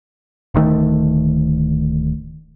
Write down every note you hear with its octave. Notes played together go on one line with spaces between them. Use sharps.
D1 D2 D#3 A3